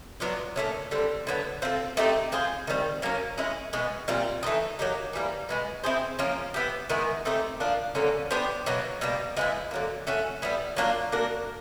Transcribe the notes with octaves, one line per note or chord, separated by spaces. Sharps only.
F#3 B3 D4 F4
A#2 F3 A3 C#4
D3 G3 C4
D3 F#3 B3
C4 F4 A4
A3 C4 D#4 G4
C4 F4 G#4 C5
D#3 G3 C4
F#3 A#3 C#4
G#3 C#4 E4 G#4
B2 G#3 B3
A#2 G3 C4 F4
E3 A3 C4 D#4
F#3 A#3 D#4 G4
E3 G3 A#3
B2 G#3 B3
C4 E4 G#4 C5
F3 A#3 C#4
B3 E4 G4
D#3 G#3 B3 E4
A3 C4 D#4 G4
F3 A#3 D4
D3 F#3 A#3 C#4
B3 D4 G4 C5
B2 F#3 A#3
B2 G3 A#3
F3 G#3 B3 E4
D3 F#3 A#3
A3 C#4 F#4
G3 B3 E4
F#3 A#3 D4 F4
A#3 D4 F#4 A#4